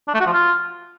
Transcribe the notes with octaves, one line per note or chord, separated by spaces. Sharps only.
D4
A3
F#4
F3
F4